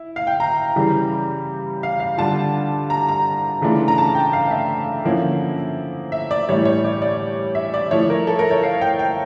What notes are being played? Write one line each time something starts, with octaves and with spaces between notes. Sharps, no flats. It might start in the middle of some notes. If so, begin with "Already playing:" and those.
Already playing: E4
F5
G5
A#5
C#3 E3 G3
F5
F5
D3 G3 D4 F4 A5
A#5
A#5
C#3 E3 A3 D4 F4
A#5
A5
G5
F5
E5
D3 F3 A#3 C#4 E4
E5
D5
A2 E3 G3 C#5
C#5
D5
D5
E5
D5
F3 A3 E4 C#5
A#4
A4
A#4
C#5
F5
G5
G5